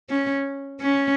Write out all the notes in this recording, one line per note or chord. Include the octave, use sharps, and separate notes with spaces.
C#4
C#4